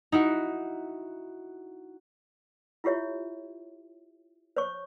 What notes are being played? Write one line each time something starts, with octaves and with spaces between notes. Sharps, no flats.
D#4 E4 F#4
E4 F4 G4 C#5 E5
C5 C#5 C#6